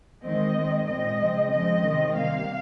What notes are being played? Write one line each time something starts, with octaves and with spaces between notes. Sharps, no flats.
D#3 G#3 C4 D#5
D#3 G#3 C4
A#2 G#3 C4 D#5
C#3 F3 G#3 C4
C#3 F3 G#3 C4 D#5
C3 D#3 G#3 C4
C3 G3 A#3 F5